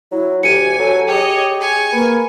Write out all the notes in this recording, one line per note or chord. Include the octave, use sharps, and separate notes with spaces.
F#3 E4
D2 G4 G#5 C#7 D#7
F#3 A4
G4 G#4 C#5 D#5
G#5 C#6
A#3 B4